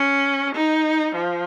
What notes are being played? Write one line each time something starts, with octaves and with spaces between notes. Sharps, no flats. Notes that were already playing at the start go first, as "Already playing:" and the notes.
Already playing: C#4
D#4
F3